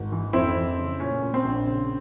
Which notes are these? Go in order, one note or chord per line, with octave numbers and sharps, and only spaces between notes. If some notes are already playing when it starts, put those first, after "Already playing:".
Already playing: G#1
E3
F2 C4 E4
E3
C#3
A#2 C#4
A#2
C4
A#1
C#3